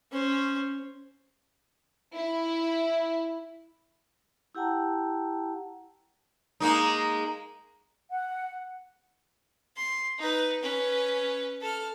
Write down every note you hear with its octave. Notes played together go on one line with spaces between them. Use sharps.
C#4 C5
E4
E4 G4 F#5 G5 A5 A#5
G#3 A#3 D#4
F#5
C6
D#4 B4
C#4 B4
A4 F6